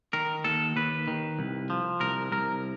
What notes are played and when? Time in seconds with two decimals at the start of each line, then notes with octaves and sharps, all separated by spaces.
0.13 D#3 A#4
0.44 D#2 A4
0.76 D#2 B4
1.08 D#3
1.39 C2
1.70 F3
2.01 C2 A#4
2.32 C2 A#4